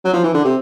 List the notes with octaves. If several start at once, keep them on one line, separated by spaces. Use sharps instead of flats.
F#3
F3
E3
D3
C3